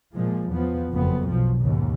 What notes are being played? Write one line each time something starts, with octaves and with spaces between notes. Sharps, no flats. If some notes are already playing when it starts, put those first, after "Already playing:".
A#2 F3 G#3
E2 F3 B3
F#1 F2 B3
B1 F3
D#2 G#2 C#3